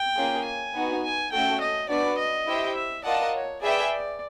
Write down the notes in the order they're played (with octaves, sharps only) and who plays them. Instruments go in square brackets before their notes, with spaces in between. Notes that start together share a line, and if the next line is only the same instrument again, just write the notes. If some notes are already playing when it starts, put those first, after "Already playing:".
Already playing: [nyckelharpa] G5
[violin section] A#3 C#4 F4 G#4
[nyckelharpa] G#5
[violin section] B3 D#4 F#4
[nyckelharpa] G#5
[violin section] A3 C#4 F#4 A4 [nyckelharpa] G5
[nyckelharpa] D#5
[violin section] B3 D4 F#4 B4 [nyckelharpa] D5
[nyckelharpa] D#5
[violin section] E4 G4 C5 E5 G5
[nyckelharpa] E5
[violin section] F4 A#4 D#5 F#5 A5 [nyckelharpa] D5
[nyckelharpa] C#5
[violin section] G#4 B4 E5 G5 [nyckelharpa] D5
[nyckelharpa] D5